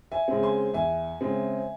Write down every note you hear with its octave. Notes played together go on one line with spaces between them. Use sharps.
E5 G#5
C#3 G#3 C4
G#5 C6
E2 E5 G#5
C#3 G#3 C4